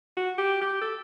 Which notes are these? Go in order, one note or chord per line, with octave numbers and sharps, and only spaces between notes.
F#4
G4
G4
A4